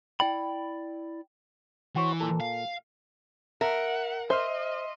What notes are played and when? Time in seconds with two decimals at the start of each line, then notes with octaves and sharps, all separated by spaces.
0.20 E4 D5 G5 B5
1.96 E3 F#4 C5 C#5
2.20 A#2 A4
2.41 F5
3.61 A#4 E5 F#5
4.30 C5 D#5 E5 C6 F6